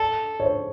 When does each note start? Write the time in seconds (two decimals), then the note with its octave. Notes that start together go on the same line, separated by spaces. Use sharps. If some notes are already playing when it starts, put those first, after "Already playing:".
Already playing: A4 D5
0.40 C#5
0.45 C5